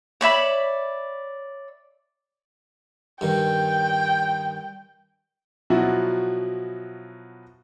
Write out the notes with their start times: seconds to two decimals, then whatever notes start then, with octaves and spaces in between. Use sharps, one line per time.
0.21 C#5 D5 E5 B5
3.21 G2 D#3 G5
5.70 B2 F3 F#3 E4 F#4